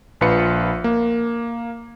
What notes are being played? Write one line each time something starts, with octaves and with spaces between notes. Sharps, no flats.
A#1 F4 B4 C#7
A#3